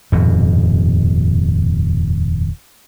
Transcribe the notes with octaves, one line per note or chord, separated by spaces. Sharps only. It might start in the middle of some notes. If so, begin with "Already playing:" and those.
D#1 F2 G#2 B2